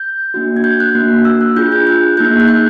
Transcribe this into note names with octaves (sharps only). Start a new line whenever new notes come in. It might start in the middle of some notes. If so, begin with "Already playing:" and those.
Already playing: G6
A#3 D4 F#4
G#6
G6
F#6
A#3 D4 F#4
E6
F#6
D4 F4 G#4 G6
G6
F#6
A#3 D#4 G#4 G6
F#6
G6